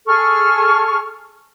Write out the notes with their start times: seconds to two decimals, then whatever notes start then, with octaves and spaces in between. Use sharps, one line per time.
0.06 G#4 A4 C#6 F6